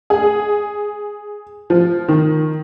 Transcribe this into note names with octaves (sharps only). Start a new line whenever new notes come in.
G#4
F3
D#3